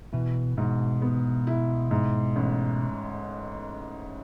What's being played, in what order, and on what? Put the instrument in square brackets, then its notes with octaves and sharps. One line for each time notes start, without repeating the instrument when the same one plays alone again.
[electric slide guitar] B2 [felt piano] E3
[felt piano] G#2 [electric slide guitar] B2
[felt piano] B3
E4
G#2
A1